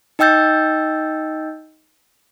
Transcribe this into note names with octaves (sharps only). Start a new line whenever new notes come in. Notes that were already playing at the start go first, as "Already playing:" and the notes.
D#4 D#5 G5 E6 G6 A6